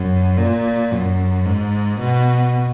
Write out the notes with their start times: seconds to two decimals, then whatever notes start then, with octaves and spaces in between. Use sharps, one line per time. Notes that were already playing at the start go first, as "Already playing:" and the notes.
Already playing: F#2
0.37 A#2
0.91 F#2
1.46 G#2
2.00 B2